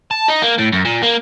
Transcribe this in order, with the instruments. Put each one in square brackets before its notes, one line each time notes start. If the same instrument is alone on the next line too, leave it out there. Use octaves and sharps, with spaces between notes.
[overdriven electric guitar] A5
D#4
A#3
A2
F#2
A#2
A#3